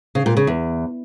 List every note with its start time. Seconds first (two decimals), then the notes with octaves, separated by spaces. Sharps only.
0.15 C#3
0.26 A#2
0.37 C#3
0.47 E2